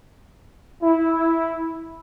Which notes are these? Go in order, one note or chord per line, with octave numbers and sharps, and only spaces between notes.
E4